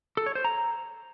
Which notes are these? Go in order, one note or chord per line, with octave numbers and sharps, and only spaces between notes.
A4
C#5
C5
A#5